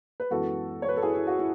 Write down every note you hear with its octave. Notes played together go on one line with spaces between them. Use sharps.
B4
F#2 E3 G#3 B3 F#4 A4
C#5
B4
A4
E4 G#4
E4
F#4
E4